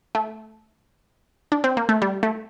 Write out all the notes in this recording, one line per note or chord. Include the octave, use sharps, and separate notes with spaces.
A3
D4
C4
A#3
A3
G3
A3